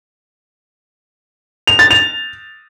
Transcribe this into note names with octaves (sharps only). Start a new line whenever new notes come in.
F7
A6
F7